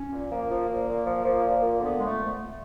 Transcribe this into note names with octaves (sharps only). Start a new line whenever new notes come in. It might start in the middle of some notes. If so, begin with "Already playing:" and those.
Already playing: C#4
A#2
F3 A#3
F3
A#2
A#2
F3
F3
A#2
A#2
D3 B3
F2 G#3
A3